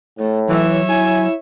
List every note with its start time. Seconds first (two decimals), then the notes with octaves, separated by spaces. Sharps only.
0.19 A2 A3
0.49 E3 F#3 C#5 E5
0.89 E4 G#5